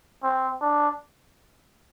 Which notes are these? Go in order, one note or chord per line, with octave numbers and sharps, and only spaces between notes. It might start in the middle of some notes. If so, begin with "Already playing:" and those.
C4
D4